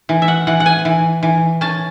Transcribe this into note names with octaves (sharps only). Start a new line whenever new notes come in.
E3
E5
F#5
E3 F#5
F#5
G#5
E3
E3
C#4 A5